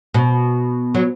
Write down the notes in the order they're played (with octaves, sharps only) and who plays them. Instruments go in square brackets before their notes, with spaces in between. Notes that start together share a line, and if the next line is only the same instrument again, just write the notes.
[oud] B2
F#3